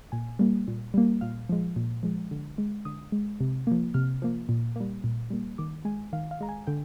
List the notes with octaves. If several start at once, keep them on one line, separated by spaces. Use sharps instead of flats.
A#2 G#5
G3 A#3
A#2
G3 A#3
A#2 F5
F3 G#3
A#2
F3 G#3
D3
G#3
D3 D#6
G#3
C3
F3 A#3
C3 F6
F3 A#3
A#2
G3 A#3
A#2
G3 A#3
D#3 D6
G#3 G#5
D#3 F5
F5
G#3 A#5
G#5
D3 G5